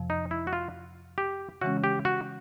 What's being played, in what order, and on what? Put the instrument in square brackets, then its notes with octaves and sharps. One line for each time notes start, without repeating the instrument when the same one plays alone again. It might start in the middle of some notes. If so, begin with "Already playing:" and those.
Already playing: [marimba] F2 C3 F3
[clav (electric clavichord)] D#4
E4
F#4
F4
G4
[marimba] C#3 E3 G#3 C#4 [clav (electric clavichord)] F#4
[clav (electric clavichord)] G4
F#4